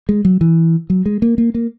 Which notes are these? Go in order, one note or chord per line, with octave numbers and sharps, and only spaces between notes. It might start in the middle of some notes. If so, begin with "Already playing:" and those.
G#3
F#3
E3
F#3
G#3
A#3
A#3
A#3